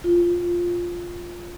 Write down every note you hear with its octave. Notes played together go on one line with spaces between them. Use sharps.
F4